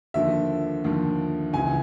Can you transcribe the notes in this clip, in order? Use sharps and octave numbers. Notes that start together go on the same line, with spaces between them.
D#2 D3 F3 E5
D#2 D3 F3
C#2 C#3 E3 G#5